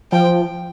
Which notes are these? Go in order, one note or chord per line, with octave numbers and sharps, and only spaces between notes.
F3 G5